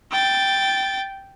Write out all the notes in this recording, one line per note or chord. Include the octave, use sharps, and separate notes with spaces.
G5 A6